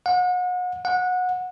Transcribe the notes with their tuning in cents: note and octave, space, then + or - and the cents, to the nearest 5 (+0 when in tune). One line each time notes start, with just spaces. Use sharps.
F#5 -35
F#5 -20